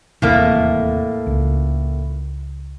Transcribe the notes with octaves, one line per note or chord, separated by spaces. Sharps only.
D#1 E2 A2 C3 A3 A#3
C#2